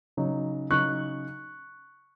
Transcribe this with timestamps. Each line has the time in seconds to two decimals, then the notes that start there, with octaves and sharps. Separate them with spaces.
0.17 C#3 F#3 D#4
0.70 C#3 F#3 D#4 C#6 F#6